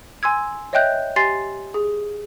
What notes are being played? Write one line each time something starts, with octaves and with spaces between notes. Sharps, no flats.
G#5 C6 E6 G#6
C#5 D#5 E5 G5 F#6 G6
G4 G#5 C6 A6 C7
G#4